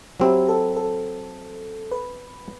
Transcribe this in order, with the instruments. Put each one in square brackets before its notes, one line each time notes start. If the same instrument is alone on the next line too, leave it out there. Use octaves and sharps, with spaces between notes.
[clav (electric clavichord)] F#3 C4 E4 [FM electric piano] G4
[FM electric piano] A4
A4
B4